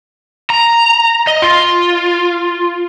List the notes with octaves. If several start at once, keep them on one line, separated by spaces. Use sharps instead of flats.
A#5
D#5
F4